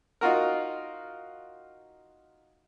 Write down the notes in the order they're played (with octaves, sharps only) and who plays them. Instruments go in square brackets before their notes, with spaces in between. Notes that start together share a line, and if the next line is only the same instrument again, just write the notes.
[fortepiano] D#4 F4 F#4 A#4